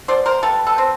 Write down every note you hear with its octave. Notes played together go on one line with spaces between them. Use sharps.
B2 C5 D5
A#4 C5
G3 A4 B4
A4 B4
C4